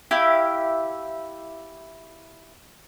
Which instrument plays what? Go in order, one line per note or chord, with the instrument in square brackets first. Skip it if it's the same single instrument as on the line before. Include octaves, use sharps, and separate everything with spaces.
[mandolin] E4 G4 F5